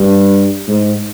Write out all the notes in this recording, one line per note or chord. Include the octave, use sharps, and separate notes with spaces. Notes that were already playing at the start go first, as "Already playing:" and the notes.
Already playing: G2
G#2